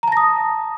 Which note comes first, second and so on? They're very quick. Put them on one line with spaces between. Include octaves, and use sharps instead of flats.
A#5 A5 A#6 D#6